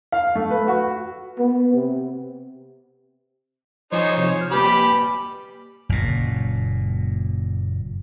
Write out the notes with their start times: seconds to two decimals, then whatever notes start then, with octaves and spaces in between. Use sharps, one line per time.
0.12 F5
0.35 A3
0.51 B4
0.68 F#4
1.38 B3
1.74 C3
3.92 F3 D#4 C5 C#5 G#5 G#6
4.18 C3 F3 F4
4.37 F6 G6
4.51 A#3 G4 B4 G#5 B5
5.89 F#1 A#2